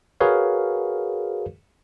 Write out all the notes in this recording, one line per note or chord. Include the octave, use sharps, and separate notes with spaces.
F#4 G#4 A#4 B4 C#5 F5